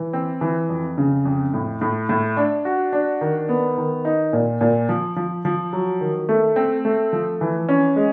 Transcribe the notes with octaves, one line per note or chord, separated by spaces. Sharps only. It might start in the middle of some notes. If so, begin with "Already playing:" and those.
Already playing: E3
C4
E3
F2
C#3
F2
A2
A2
A2
D4
F#4
D4
D#3
B3
D#3
D#4
A#2
A#2
F3
F3
F3
F#3
D#3
A3
C4
A3
F3
E3
C#4
G#3